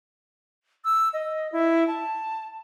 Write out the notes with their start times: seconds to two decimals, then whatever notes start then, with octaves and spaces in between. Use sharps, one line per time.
0.84 E6
1.13 D#5
1.52 E4
1.88 A5